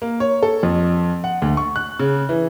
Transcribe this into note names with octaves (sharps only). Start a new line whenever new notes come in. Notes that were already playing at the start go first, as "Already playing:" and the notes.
A#3
C#5
A4
F2
F#5
D2
C#6
F#6
C#3
E3